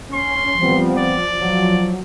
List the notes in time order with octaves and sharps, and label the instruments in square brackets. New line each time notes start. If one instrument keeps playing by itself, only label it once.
[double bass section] C#4 [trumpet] C6
[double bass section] F3 [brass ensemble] G3 B3 C4
[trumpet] D5
[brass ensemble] F3 [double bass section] F#3